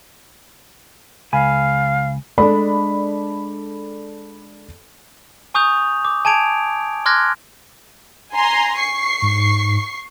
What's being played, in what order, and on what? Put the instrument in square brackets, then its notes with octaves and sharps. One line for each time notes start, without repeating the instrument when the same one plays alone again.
[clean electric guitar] C#2 G#5 B5 [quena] F5
[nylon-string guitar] G#3 D4 [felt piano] A4 D5 B5
[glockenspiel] G#5 C#6 D#6 G6 F7
D6
G#5 A5 G#6 D7 F7
C6 D6 F6 F#6 G#6 A#6
[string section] G#5 A#5 C6
C#6 C7
[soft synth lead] G#2